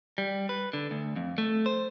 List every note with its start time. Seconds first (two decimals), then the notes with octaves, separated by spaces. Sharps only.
0.18 G3
0.49 B4
0.73 D3
0.91 D2
1.16 F2
1.38 A3
1.66 C5